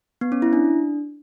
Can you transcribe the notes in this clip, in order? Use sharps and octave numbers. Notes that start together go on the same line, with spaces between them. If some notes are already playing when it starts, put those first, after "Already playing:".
B3
C#4
E4
D4